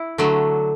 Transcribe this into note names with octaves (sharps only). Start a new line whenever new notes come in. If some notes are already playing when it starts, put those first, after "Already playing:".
Already playing: E4
D3 F#3 A3